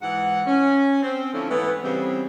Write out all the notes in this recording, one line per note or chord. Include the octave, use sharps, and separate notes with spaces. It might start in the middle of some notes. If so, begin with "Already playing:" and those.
G#2 E3 G#3 F#5
C#4
C4
D3 F3 A3 C#4 D4 E4
G#2 E3 A3 B3
C#3 E3 G3 B3 C4